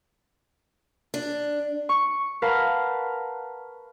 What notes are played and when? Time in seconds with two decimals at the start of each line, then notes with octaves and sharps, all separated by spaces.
1.14 D4
1.89 C#6
2.42 A#4 B4 F5 F#5 A5 A#5